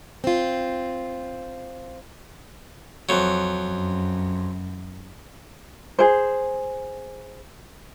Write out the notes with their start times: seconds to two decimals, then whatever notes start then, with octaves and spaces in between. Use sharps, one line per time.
0.24 C4 F4
3.09 F2 F#3
3.67 F#2
5.99 G#4 C5